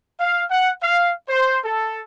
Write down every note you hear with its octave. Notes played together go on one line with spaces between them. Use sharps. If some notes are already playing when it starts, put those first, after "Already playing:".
F5
F#5
F5
C5
A4